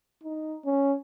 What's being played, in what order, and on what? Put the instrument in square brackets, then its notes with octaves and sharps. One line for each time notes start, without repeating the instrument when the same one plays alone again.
[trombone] D#4
C#4